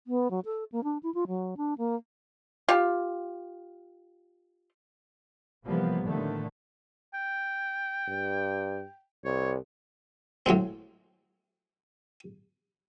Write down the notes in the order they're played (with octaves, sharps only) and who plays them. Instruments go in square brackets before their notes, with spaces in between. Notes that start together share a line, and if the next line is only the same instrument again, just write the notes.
[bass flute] B3
F#3
A4
A#3
D4
E4
F4
F#3
D4
A#3
[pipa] F4 G4
[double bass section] C3 E3 F3 G3 A#3 B3
A2 D3 D#3 A3
[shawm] G5
[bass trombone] G2
[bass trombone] C2 [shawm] C#5
[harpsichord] A2 F#3 G#3 C4